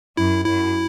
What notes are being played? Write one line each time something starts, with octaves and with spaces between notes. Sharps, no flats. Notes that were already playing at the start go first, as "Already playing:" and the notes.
F#2 E4
F#2 E4